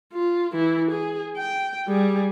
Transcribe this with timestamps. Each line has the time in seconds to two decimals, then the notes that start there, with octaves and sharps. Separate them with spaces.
0.13 F4
0.52 E3 E4
0.91 G#4
1.37 G5
1.88 G3 G#4